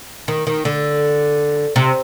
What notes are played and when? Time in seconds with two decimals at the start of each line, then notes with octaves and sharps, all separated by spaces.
0.28 D#3
0.47 D#3
0.65 D3
1.76 C3